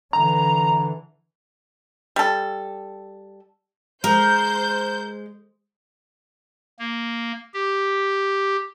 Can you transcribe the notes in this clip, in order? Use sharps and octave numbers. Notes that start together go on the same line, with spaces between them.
D3 E3 A#5
G3 A4
G#3 A#4 C5 G6
A#3
G4